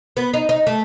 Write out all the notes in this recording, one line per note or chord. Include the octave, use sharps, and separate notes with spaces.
B3
D#4
D#4
A3